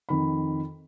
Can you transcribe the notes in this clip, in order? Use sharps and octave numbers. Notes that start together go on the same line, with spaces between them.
F2 D#3 B5